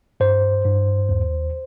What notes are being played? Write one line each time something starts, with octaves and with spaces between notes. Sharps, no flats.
G2 C5
G2
D#2